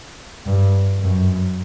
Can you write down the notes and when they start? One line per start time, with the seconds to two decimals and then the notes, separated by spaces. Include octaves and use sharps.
0.46 G2
1.01 F#2